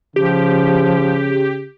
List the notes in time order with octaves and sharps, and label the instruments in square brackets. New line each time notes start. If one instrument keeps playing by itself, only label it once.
[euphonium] C#3 [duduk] F3 [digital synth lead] G4